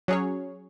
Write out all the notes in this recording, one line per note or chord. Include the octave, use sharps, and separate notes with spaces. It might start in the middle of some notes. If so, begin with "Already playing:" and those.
F#3 C#4 G#4 C#5